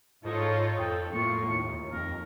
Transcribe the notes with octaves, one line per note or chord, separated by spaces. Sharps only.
G#2 D#4 F4 A4 C#5
F2 A4 G5
A2 A#3 F4 C#6
D#2
F2 A#4